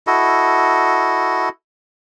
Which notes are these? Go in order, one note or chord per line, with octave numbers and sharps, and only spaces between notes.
E4 F#4 A4 D#5